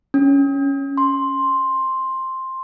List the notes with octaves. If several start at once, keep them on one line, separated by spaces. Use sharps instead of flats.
C#4
C6